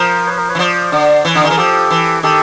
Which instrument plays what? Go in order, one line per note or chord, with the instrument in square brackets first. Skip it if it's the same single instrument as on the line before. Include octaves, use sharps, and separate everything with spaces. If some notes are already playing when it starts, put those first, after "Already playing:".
Already playing: [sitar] F3 [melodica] A#4 C5
[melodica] B4 C#5
A#4 C5
B4 C#5
[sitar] E3
[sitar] F3 [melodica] C5 D5
[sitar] D3
[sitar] E3 [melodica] B4 C#5
[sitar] D3
D#3
[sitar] E3 [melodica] G#4 A#4
[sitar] F3 [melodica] G4 A4
[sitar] E3
[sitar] D#3 [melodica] G4 A4